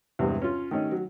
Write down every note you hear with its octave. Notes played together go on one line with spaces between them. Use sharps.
E2 G2 C3 G3 G#3
C#4 F4
D#3 A3 C#4 D#4
F#3